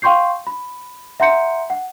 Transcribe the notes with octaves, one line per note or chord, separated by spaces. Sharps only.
F5 G5 C6 C#6 G6 C7
B5
E5 F#5 A#5 C6 G6 C#7
F#5